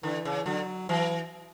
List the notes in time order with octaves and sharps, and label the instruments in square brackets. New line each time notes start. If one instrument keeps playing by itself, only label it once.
[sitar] D3 [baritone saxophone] E3
[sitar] C#3
[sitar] D3 [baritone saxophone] F#3
[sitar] E3 [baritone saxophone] F#3